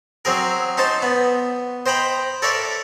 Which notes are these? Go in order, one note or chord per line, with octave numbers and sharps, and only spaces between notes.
F#3 C4 G#4 A#4
C#4 D#4 C5 A5
B3
C5 D#5 G5 A#5 B5
A4 A#4 C#5 D5 E5